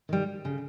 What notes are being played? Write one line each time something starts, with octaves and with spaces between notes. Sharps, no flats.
D#3 G3
C#3